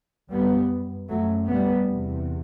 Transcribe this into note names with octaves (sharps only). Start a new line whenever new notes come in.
F#2 G3 B3
F#2 F#3 A3
G3 B3
E2 C3